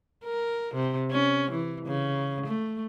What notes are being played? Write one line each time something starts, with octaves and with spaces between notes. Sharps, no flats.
A#4
C3
C#4
E3
C#3
A3